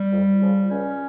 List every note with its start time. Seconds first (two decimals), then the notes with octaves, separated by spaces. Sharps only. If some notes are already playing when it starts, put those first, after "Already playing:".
Already playing: G3
0.12 F2
0.41 C#3 F3
0.70 C#2 C#4